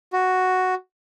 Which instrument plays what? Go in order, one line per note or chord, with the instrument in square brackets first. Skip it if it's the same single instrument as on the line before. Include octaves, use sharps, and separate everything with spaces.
[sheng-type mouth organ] F#4